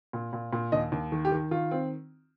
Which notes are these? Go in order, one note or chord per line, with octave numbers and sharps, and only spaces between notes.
A#2
A#2
A#2
D#2 D#5
D#2
D#3
G4
D#3
D#3 F4
C4